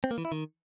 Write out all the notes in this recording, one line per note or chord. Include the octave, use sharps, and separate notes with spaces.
C4
A#3
E3
E4
D#3